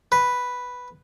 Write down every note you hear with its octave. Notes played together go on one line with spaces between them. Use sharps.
B4